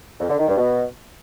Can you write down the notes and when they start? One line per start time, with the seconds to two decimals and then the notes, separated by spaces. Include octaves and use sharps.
0.20 F2
0.29 D3
0.39 D#3
0.48 G2
0.57 B2